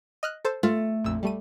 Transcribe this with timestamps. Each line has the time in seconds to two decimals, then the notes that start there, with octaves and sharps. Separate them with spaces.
0.23 D#5 F6 F#6
0.45 A4 C5 A5
0.63 A3 F4
1.04 A#1 F2 E6
1.23 G3 A3 D#7